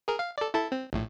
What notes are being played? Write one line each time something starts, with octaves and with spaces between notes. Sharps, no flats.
G#4 A#4
F5
A4 D5
E4 A4 A5
C4
A#1 A2